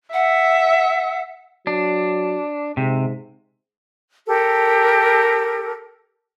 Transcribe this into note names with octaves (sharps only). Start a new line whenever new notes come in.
E5 F#5
F#3 D4
G#2 C3
G4 A4 A#4